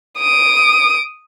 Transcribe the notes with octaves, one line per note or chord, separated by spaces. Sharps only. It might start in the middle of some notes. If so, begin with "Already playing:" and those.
D#6 D7